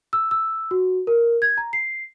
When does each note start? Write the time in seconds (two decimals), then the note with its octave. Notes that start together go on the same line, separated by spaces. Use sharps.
0.13 E6
0.31 E6
0.71 F#4
1.07 A#4
1.42 G#6
1.58 A#5
1.73 C7